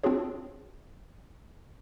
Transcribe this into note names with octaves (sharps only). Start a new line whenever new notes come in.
C4 D4 F4 F#4 G#4 C#5